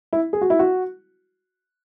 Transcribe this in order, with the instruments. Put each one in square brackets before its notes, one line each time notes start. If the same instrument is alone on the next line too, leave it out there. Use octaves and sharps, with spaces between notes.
[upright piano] E4
G#4
F#4
E4
F#4